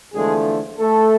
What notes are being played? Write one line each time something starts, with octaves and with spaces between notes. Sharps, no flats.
E2 D3 F3 G#3 A3 G#4
A3 A4